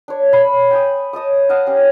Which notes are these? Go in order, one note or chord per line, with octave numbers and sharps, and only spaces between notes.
D4 C#5
C#5 B5
G5 G#5 D#6
C#5 D#5 A5 D#6
D#5 F5 F#5 A5
C#4 G4 G5